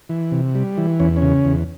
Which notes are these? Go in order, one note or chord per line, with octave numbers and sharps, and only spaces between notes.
E3
C3
G3
E3
E2 C#4
C#4
C#3
E2